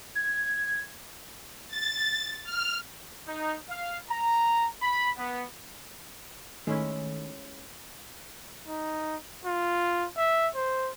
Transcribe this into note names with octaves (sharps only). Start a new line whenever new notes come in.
G#6
A6
F6
D#4
F5
A#5
B5
B3
D#3 G#3 A3 C#4 E4
D#4
F4
E5
C5